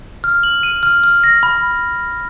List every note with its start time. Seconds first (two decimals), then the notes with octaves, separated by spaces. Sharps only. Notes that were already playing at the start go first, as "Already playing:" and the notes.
0.24 F6
0.43 F#7
0.63 D#7
0.83 F6
1.04 F6
1.24 A#6
1.43 B5